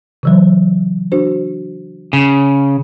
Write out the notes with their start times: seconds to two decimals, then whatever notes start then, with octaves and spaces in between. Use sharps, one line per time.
0.23 C#3 E3 F#3
1.12 D4 F#4 C5
2.13 C#3